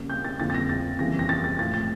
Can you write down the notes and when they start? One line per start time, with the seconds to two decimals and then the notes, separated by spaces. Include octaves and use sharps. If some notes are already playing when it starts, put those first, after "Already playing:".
Already playing: C#3 G3 A#3
0.10 G6
0.24 A6
0.39 F2 D3 F3 A#3 A6
0.50 A6
0.54 A#6
0.69 A6
0.99 F2 C#3 E3 G3 A#3 A#6
1.19 A#6
1.29 A6
1.44 A6
1.59 A2 F3 A#3 A6
1.74 A6